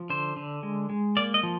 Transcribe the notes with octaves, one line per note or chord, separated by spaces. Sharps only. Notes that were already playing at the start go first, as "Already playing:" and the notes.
Already playing: F3
D3 C5
D3
G#3
G#3
A#3 D5
D#5
F3